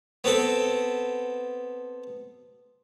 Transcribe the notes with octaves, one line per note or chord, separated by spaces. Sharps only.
B3 C4 A4